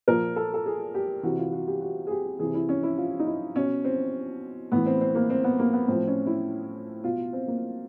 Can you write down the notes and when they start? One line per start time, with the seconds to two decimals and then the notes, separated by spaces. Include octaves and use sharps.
0.08 A#2 F3 A#4
0.36 A4
0.54 A4
0.66 G#4
0.95 G4
1.23 C3 E3 F#4
1.38 F4
1.52 F#4
1.67 G4
1.81 F#4
2.07 G#4
2.11 G4
2.39 C3 E3 G#4
2.54 E4
2.69 C#4
2.83 E4
2.98 F4
3.19 D#4
3.27 E4
3.56 B2 C#4
3.84 C4
4.72 A2 E3 B3
4.86 C4
5.01 C4
5.15 A#3
5.30 C4
5.44 B3
5.59 A#3
5.73 B3
5.88 A2 F3 C4
6.07 C#4
6.26 E4
7.04 B2 F4
7.33 C4
7.48 A#3